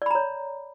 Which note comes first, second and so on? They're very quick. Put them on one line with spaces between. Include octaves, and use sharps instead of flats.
D5 B5 A#5 C#5